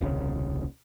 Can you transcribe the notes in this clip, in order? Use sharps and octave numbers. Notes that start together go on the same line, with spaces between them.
D#1 C2 C#3